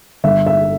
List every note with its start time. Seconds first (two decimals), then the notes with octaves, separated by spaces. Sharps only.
0.24 G1 E5
0.47 E5